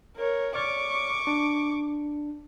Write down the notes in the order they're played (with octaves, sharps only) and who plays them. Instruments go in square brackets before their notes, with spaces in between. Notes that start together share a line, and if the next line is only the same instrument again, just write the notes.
[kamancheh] A#4 C#5
[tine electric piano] C#5 D5 F6 [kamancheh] C#6 D6
[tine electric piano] D4